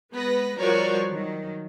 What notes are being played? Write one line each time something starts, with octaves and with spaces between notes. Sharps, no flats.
G#3 B3 B4 A#6
F3 G3 F#4 A#4 C#5 D5
D#3 F#3